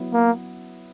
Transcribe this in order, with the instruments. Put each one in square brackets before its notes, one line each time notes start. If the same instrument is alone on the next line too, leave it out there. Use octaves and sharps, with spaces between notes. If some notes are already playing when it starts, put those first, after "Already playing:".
Already playing: [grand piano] F#3 B3 E4
[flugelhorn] A#3